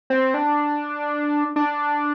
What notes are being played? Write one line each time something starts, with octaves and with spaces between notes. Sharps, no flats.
C4
D4
D4